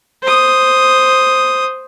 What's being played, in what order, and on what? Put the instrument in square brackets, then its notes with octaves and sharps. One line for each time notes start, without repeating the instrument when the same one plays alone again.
[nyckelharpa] C5 D#6